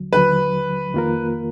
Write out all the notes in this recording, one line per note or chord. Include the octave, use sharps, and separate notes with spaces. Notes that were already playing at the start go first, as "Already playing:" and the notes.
Already playing: D#2 D3 F#3
D#2 D3 F#3 B4
F2 D#3 A#3 F4 A#4